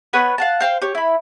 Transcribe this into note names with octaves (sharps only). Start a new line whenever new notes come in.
B3 B4 C#5 F#5
F5 F#5 A5
C5 F5 G5
G4 C#5
E4 B5